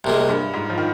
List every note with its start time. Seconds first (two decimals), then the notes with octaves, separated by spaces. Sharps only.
0.04 C2 A#2 G#3
0.29 G2
0.54 G#2
0.70 F3
0.78 D#3